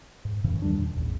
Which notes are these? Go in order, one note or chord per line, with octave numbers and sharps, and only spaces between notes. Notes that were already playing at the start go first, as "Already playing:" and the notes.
G#2
F#2 A2 C#3 E3
E2 D#3 G3 D4
A#2
A1 E2